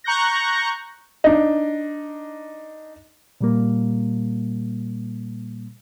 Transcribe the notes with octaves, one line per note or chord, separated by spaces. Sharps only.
A#5 C#6 F#6 G6 A#6
D4 D#4
A#2 G3 A#3